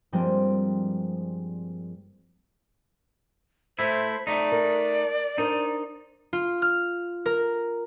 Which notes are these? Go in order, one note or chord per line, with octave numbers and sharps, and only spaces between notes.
G2 F3 G3 G#3 A#3 C4
A3 E4 C5
A3 D#4 D5
A#4
D4 D#4 A#4 C5
F4
F6
A#4